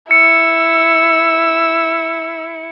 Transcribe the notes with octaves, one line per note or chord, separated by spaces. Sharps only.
E4 E6 C#7